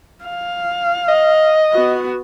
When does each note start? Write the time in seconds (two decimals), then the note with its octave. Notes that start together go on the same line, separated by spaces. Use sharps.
0.25 F5
1.08 D#5
1.73 B3 F#4